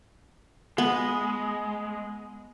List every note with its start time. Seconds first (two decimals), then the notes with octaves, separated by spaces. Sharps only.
0.78 G#3 B3